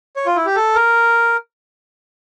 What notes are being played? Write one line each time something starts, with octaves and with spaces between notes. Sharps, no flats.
C#5
F4
E4
G4
A4
A#4